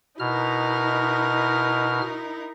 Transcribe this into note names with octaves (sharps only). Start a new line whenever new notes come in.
B2 D#4 E4 A#4 F6